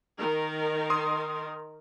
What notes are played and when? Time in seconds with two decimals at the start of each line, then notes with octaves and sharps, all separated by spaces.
0.18 D#3 A#4
0.90 C6 D#6